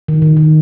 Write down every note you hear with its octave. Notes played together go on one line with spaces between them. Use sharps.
D#3
D#3
D#3